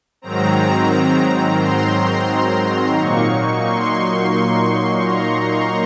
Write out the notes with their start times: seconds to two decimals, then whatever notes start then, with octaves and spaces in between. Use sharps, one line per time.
0.22 G#2 D#3 F#3 C4 A#5
1.58 C6
2.96 A#2 F#3 A#3 D#4 C#6
3.65 C6
5.02 A#5
5.37 C6